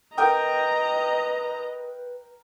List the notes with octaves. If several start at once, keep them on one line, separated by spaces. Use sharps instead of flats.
A#4 B4 D#5 G5 A#5 D#6